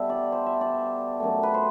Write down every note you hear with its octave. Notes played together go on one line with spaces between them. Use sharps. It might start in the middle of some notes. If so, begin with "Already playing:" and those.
Already playing: B2 G3 A4 E5
D5
C5
E5
D5
F#2 F#3 A3
B4
C5